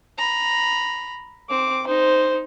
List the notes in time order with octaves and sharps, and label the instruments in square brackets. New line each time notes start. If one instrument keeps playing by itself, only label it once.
[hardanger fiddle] A#5 B5
[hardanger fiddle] C4 [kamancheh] D6
[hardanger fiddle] D#4 [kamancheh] C5